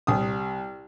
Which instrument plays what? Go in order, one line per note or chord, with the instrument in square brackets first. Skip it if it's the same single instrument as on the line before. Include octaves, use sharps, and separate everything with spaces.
[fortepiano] C2 D#6